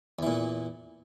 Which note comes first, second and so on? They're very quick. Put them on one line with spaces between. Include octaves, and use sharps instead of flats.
E2 E3 A#2